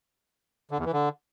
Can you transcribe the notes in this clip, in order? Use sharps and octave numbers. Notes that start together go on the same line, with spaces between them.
D3
E2
E3
D3